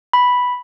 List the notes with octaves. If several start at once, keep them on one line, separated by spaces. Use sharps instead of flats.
B5